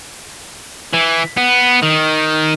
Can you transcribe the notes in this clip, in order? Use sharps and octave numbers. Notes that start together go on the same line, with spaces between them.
E3
B3
D#3